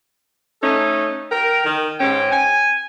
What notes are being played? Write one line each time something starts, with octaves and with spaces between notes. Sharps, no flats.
A3 C#4 D#4 A4
A#4 G5
D#3
G#2 C#4 G5
G#5